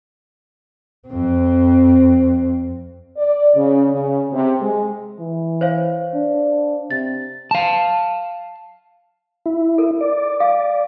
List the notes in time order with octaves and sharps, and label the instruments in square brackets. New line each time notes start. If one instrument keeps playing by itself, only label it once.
[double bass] F2 C4
[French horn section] D5
C#3
C#3
C3
G#3
[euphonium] E3
[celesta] C5 C#5 F5
[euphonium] D4
[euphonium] C3 [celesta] A6
[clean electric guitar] F5 A5
[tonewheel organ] E4
[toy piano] A4 A#4
[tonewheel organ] D5
[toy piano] F5 D#6